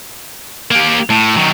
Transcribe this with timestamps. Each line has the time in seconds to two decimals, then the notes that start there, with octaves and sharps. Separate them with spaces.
0.71 A#3 G4
1.10 A2
1.37 D#3 F#3